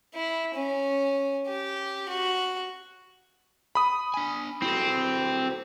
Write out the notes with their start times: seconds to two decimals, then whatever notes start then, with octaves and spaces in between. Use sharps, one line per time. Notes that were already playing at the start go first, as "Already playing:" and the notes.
0.14 E4
0.54 C#4
1.47 G4
2.09 F#4
3.75 B5 D#6
4.14 D4 G#5
4.62 C4 E4 F#4 A4